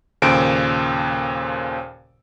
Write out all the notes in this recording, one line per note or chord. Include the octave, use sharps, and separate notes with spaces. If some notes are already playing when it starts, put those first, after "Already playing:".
D#2 A#2 C#3 A4 C5 D7